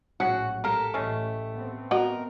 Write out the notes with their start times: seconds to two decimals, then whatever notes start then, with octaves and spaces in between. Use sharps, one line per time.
0.20 A#1 A2 F#3 C#4 F#4 G#4 F#5
0.64 A2 A#3 G4 A4 A#4
0.94 A1 G#3 A3 C#4
1.53 B3 C4
1.91 F#4 A#4 D#5